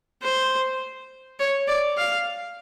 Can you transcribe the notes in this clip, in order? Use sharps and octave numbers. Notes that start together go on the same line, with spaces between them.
C5
C#5
D5
F5